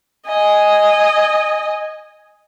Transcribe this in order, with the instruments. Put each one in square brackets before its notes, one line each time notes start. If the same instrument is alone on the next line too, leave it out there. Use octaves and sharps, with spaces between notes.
[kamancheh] D#5 G#5